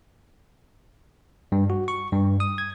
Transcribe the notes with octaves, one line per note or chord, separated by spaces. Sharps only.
G2
F#4
C#6
G2
D#6
G#6